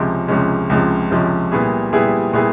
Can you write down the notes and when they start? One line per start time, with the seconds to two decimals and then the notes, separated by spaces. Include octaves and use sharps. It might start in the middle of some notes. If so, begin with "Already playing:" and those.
Already playing: C#2 C3 F3 G#3 C#4
0.28 C#2 C3 F3 G#3 C#4
0.70 C#2 C3 F3 G#3 C#4
1.10 C#2 C3 F3 G#3 C#4
1.52 A#2 G3 B3 E4 G#4
1.92 A#2 G3 B3 E4 G#4
2.33 A#2 G3 B3 E4 G#4